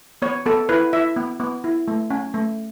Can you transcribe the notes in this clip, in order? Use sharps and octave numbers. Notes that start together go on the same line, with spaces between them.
B3 C#5
B3 A4
E4 B4
E4 E5
B3
B3
E4
A3
C#4
A3